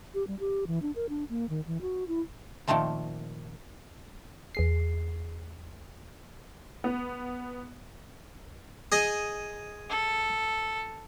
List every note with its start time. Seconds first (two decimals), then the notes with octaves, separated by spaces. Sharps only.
0.14 G4
0.27 G3
0.40 G4
0.67 E3
0.82 D4
0.96 A#4
1.09 D4
1.29 A#3
1.49 D#3
1.67 E3
1.82 F#4
2.08 E4
2.68 A#2 D#3 F3 A3 C4
4.55 E2 G#4 C7
6.84 B3
8.92 G#4 D#5
9.90 A4